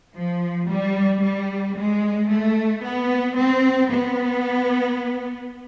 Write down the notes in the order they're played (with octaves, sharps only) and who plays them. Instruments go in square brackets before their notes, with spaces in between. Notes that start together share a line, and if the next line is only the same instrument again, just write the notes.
[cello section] F3
G3
G3
G#3
A3
B3
C4
B3